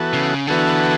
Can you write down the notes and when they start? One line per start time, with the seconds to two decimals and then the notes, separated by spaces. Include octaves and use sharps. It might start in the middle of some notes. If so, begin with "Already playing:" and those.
Already playing: E3 B3 F#4 A4
0.13 C#3
0.47 D3 E3 B3 F#4 A4